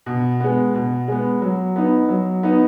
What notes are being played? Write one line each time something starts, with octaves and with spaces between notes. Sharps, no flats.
B2
G#3 B3
B2
G#3 B3
F#3
B3 D#4
F#3
B3 D#4